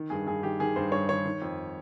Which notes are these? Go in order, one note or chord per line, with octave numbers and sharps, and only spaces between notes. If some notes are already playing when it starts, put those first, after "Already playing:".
Already playing: D#3
G2 G#4
G2 G#4
D#3 G4
D#3 G#4
G2 C5
G2 C#5
D#3 C#5
D#3
F2